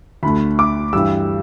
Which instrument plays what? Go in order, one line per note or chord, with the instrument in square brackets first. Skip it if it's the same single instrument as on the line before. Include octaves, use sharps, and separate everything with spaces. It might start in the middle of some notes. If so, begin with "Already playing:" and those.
[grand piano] D2 D3 A3 B5
D6
G2 E3 G3 E6